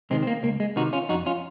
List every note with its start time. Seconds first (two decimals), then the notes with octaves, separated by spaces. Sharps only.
0.11 C3 D#3 G#3 C4
0.23 C4
0.27 A#3
0.43 C#2 A#3
0.60 G#3
0.76 C3 D#3 D#4 F#4
0.93 C#4 F4
1.09 F2 D#4 F#4
1.26 C#4 F4